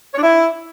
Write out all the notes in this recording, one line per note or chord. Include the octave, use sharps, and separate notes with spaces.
C#5
D4
E4